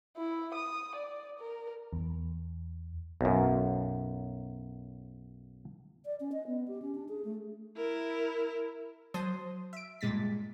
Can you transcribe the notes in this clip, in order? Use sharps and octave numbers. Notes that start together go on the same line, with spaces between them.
E4
D#6
D5
A#4
E2
B1 F#2
D5
C#4
D#5
B3
G4
C#4
D4
G#4
A3
E4 A#4
F#3 C5 A5 C6 D#6
E5 D7
G2 A#2 G#3 A6 B6